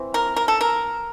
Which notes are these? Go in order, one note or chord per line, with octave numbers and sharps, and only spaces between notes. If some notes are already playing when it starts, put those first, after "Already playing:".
Already playing: E3 C4
A#4
A#4
A4
A#4